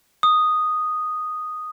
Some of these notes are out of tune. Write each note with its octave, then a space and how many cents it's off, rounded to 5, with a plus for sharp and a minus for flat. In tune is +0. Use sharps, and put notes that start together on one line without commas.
D#6 -5